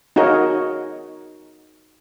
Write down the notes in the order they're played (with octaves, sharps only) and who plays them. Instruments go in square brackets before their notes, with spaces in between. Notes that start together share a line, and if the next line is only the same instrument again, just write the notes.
[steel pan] D#4 F#4 G#4 A#4 C#5